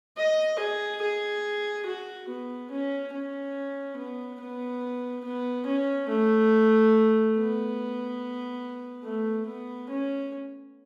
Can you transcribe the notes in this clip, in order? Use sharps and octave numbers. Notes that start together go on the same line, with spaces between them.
D#5
G#4
G#4
F#4
B3
C#4
C#4
B3
B3
B3
C#4
A3
B3
A3
B3
C#4